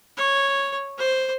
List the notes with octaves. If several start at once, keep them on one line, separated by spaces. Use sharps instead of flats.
C#5
C5